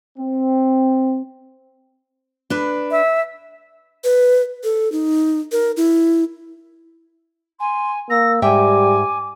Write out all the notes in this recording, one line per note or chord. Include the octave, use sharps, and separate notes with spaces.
C4
D4 B4
E5
B4
A4
D#4
A#4
E4
G#5 C6
A#3 E6 A#6
G#2 G3 E5 G5 G#5 D6